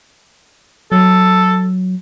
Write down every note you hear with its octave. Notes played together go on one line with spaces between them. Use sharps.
F#3 A4